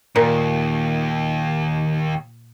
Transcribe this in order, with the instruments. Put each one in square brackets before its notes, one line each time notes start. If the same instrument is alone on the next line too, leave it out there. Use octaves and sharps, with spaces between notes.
[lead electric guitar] D#2 [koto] A#2